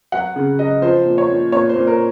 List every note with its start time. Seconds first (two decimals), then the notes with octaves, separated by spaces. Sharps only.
0.12 F#3 F#5
0.36 C#3
0.59 F#3 D#5
0.82 F3 C5
1.06 A#2
1.18 C#5
1.29 A#2
1.52 A#2 C#5
1.69 C5
1.76 A#2
1.87 A#4